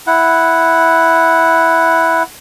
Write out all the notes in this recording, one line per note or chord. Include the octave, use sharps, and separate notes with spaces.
E4 F#5